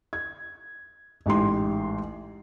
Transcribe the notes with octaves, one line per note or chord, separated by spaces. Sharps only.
G#6
A1 G#2 G4 C6